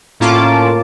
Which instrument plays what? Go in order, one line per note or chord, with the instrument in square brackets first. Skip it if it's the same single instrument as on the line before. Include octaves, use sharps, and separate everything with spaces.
[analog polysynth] A2 A#3 C#4 F4 A5 D6